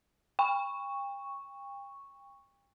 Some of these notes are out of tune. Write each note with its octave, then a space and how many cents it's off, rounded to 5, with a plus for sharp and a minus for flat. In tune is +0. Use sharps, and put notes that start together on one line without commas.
G5 +35 C#6 +0